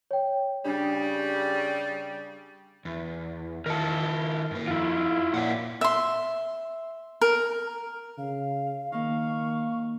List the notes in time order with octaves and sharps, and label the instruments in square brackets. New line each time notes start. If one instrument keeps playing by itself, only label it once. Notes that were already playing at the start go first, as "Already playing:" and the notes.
[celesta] C#5 G5
[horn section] C#3 G3 [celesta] D4
[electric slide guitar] E2
[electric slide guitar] D#3 E4 F4 [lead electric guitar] A#4 A5
[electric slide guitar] G2 A#3
[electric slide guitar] F2 [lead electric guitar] E4 F4
[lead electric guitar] A#2 [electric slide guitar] C#5 E5 F#5
[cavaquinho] E5 C6
A#4
[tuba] C#3 [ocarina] F5
[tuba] D#3 [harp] A#3 D#4 [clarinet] F5 [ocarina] C#6